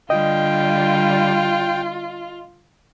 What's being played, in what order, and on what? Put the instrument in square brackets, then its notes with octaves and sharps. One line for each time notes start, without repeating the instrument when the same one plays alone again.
[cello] D3 G3 [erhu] F4 [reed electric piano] D#5 [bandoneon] G5